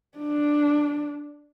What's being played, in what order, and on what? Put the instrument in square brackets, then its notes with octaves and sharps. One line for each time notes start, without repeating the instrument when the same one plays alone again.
[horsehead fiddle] D4